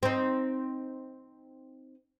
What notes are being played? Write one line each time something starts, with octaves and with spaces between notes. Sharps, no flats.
C4 D#4